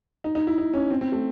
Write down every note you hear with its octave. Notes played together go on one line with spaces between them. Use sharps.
D#4
D#4
E4
D#4
C#4
C4
C4
A3